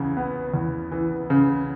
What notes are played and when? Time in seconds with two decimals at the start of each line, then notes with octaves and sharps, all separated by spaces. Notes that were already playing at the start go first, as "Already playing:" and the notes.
Already playing: E2 C#3
0.17 B3
0.54 E2
0.92 E3
1.30 C#3